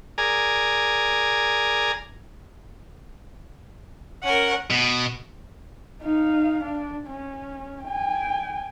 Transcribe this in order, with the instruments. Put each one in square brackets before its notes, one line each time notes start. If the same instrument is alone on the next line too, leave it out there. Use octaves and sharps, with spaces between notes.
[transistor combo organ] G#4 A#4 D5 G#5 A#5
[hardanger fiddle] C#4 A#4 [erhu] F#5
[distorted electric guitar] B2
[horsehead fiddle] D#4 F5
D4
C#4
G5 G#5